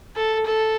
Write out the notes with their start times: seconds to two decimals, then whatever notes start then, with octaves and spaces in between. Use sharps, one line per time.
0.16 A4
0.46 A4